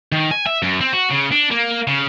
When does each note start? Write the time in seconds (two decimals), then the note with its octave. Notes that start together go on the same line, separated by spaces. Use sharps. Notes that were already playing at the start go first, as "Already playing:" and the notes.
0.12 D#3
0.31 G#5
0.47 E5
0.63 F#2
0.81 C4
0.93 F#4
1.10 C#3
1.32 D4
1.51 A#3
1.87 C#3